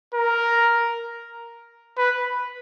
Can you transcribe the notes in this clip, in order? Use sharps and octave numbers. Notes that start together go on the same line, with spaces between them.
A#4
B4